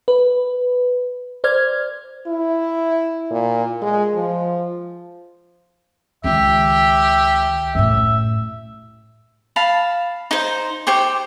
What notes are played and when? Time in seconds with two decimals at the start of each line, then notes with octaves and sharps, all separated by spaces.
0.08 B4
1.44 C5 D5 F6 G#6
2.27 E4
3.31 A#2
3.82 G#3
4.15 F3
6.24 C#2 D#3 G4 E5
7.75 F#2 A2 E5
9.56 F5 A5 B5
10.31 D#4 C5
10.87 G4 C5 G5 C#6